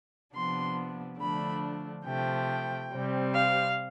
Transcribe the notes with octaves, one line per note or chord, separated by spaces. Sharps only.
C3 F3 B3 D4 C6
D3 F3 A3 D4 B5
C3 F3 A3 G5
C3 G3 C4
F5